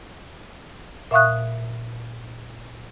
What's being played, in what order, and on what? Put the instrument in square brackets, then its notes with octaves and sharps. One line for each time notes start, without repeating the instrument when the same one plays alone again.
[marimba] A#2 E5 F5 C#6 D#6 F#6